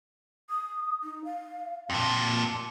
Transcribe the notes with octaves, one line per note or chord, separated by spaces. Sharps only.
D#6
D#4
F5
F2 A#2 A5